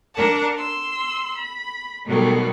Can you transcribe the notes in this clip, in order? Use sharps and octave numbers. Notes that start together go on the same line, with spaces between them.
D4 A#4 F#5 A5
C6 E6
B5
B2 D#3 F#3 G3 A3 B3